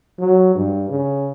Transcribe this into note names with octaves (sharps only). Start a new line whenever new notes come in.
F#3
G2
C#3